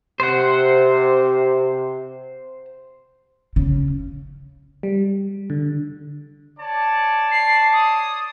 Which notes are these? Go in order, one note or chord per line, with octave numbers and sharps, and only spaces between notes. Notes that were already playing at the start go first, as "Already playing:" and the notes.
C3 C5 F#5
C#3
G3
D3
C#5 D5 A5
C7
D#6